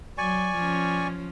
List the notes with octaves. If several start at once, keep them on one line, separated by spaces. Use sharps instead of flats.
F#3 D5 G#5 C#6
F3 C#4